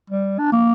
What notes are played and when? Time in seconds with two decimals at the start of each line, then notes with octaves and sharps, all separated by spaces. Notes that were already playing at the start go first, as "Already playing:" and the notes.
0.10 G3
0.39 D4
0.52 A#3